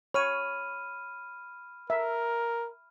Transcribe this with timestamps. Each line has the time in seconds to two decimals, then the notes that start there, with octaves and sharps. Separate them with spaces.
0.14 C#5 B5 F6 D#7
1.90 A#4 E5